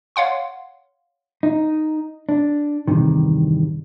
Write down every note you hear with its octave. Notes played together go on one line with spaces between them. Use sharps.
C#5 F5 F#5 C6
D#4
D4
E2 G2 C3 D#3